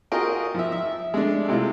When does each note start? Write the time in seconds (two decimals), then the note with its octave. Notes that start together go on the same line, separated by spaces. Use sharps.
0.12 F4 F#4 G#4 A#4 D#5 G5
0.55 F3 E5
0.72 E5
1.14 G#3 A3 D4
1.48 C3 G#3 E4 F4